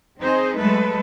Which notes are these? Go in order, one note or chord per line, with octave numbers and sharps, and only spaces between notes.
C4 D#4 G#4 C5
F#3 G#3 A3 A4 B4